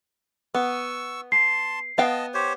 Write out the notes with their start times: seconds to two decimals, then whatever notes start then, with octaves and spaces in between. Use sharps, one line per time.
0.54 B3 C#6 E6
1.32 A5 C6 C7
1.98 B3 D#5 F5 G5 A5
2.34 G4 C5 C#5